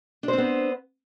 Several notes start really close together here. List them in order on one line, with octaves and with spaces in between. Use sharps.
D4 C5 C4 B3